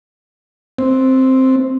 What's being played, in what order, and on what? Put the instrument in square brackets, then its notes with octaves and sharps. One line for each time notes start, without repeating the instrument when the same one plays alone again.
[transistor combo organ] C4